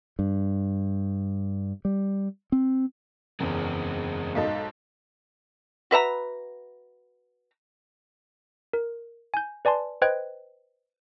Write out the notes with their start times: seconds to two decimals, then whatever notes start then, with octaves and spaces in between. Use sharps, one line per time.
0.19 G2
1.85 G3
2.52 C4
3.40 F#1 E2 G#3 C4
4.35 B1 G#2 A4 D#5 F5
5.91 F#4 B4 E5 A#5
8.73 A#4
9.34 G#5 G6
9.65 B4 D5 G#5 A5 C6
10.02 B4 C5 D#5 G5 F#6 G#6